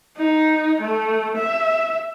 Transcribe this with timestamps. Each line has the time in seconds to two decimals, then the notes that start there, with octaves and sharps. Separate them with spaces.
0.17 D#4
0.81 A3
1.36 E5